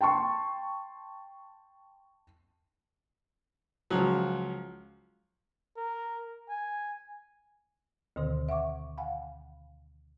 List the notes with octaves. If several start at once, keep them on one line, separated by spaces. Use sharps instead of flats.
G5 A5 C6 C#6
C#2 F3 F#3
A#4
G#5
D2 B2 D3 D#3 C5 C6
E5 F#5 C#6 D6
F5 F#5 G#5 B5